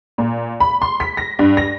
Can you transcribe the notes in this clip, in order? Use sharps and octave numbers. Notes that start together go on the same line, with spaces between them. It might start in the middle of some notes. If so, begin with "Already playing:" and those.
A#2
B5
C6
B6
A#6
G2
A#6